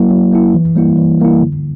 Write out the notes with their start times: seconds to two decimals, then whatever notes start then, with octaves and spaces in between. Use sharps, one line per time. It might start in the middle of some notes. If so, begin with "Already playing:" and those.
Already playing: F#3 A#3 E4
0.10 F#3
0.32 A#3 E4
0.54 E3
0.76 G3 A#3 E4
0.97 E3
1.20 G3 A#3 E4
1.41 D3